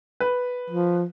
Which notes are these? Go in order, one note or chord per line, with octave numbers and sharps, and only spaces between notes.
B4
F3